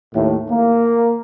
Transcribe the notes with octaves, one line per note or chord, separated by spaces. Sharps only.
D#2 A2
A#3